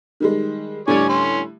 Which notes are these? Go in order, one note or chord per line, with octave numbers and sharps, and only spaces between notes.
D#3 G3 G#3
A2 D3 G3 C#5 D5 G#5
C#4 C6